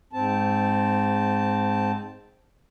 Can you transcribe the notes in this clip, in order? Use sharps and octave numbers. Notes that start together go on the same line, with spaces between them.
G#2 C4 A5